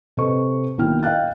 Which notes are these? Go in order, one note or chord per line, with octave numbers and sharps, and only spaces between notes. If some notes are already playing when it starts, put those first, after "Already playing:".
C3 A4 B4 D#5 C#6
B1 A#2 D#3 E4 G5 F6
D#5 F5 G5 F#6 A6